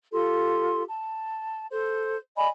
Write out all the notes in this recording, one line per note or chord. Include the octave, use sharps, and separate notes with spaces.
F4 G4 A4 C6
A5
A4 C5
D5 D#5 G#5 B5